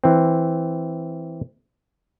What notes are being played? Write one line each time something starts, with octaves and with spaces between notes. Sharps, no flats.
E3 C4